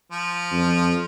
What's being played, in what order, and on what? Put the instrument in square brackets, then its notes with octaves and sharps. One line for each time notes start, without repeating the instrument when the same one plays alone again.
[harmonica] F3
[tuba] F2